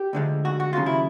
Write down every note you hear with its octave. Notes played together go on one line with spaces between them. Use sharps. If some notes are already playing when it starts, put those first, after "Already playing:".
Already playing: G4
D2 D3 F3 G#3
F#4
F#4
D#2 C#3 F#3 F4
E4